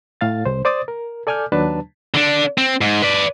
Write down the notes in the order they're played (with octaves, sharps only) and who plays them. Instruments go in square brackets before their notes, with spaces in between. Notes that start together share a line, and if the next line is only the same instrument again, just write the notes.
[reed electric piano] A2 F5 A6
C2 C5
C5 D5 D6 D#6 A6
A#4
A4 D5 G#5 D6 F6 G6
D#2 F#3 D4 B4 A5
[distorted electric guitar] D3 D4
C4
G#2
B4 D5